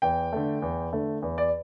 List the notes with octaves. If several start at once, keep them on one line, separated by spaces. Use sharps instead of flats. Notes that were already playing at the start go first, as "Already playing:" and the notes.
E2 G5
D3 A3
E2
D3 A3
E2
D5